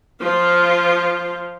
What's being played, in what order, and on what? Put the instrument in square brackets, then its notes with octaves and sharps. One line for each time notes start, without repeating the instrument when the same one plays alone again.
[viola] F3 F4